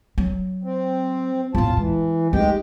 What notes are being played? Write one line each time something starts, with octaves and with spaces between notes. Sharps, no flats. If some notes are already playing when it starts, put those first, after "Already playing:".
F#3
C4
E2 A2 F4 A5
E3 G#3
G#3 A3 D#4 G4 G5